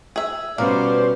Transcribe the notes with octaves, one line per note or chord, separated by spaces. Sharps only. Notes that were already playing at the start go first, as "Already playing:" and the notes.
G#4 E5
B2 G3 A#3 B3 C#4 C5 D5